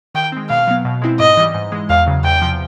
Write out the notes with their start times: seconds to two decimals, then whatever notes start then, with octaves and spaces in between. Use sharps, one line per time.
0.15 D#3 G5
0.32 G#3 C4
0.49 B2 F5
0.67 F#3 B3
0.85 B2
1.02 G#3 C4 E4
1.19 G#2 D#5
1.37 E3 G3
1.55 G#2
1.72 E3 G#3
1.89 E2 F5
2.07 C#3 F#3
2.24 E2 G5
2.42 C3 F3